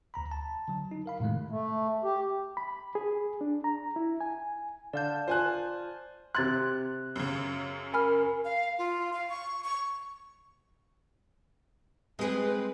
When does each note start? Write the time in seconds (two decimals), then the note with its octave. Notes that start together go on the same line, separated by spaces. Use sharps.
0.14 D2 A#5 B5
0.31 A5
0.68 D3 F#3
0.91 D#4
1.06 A#4 F5 B5
1.20 A2 C3 D#3 G#3 A3
1.50 A3
2.04 G4
2.57 B5
2.95 G#4
3.41 D4
3.64 A#5
3.96 E4
4.21 G#5
4.93 D3 D5 F5 A5 G6
5.28 F4 C5 G#5 F#6
6.35 C3 C6 F#6 G#6 A6
7.16 F#2 C#3
7.94 A#4 G#5 B5 F6
8.45 F5
8.79 F4
9.13 F5
9.29 C#6
9.64 C#6
12.19 G#3 C4 G#4 B4